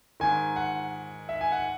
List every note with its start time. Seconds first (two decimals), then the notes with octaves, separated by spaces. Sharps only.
0.20 G#2 D#3 G#5
0.56 F#5
1.29 E5
1.41 G#5
1.52 F#5